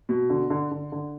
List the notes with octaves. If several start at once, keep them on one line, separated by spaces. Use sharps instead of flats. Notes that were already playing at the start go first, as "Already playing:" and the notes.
B2
D3
D3
D3
D3